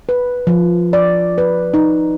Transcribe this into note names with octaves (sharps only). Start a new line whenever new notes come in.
B4
F3
D5
B4
D#4